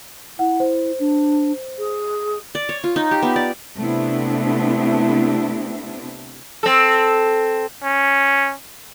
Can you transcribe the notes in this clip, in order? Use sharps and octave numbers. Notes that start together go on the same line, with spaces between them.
E4 F#5
C5
D4
G#4
D5
C#5
F4
D#4
G4
B3
D5
C3 A3 B3 C4 D4 E4
C4 A4
C#4